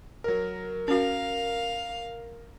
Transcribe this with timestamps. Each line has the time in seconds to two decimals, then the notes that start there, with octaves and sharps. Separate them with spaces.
0.24 F#3 A#4
0.88 C#4 F#4 A#4 F5